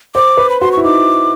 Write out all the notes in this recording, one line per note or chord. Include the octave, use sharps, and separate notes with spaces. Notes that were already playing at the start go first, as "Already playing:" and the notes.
C5 D6
B4
B5
F#4 C6
C#6
E4
D#4 D6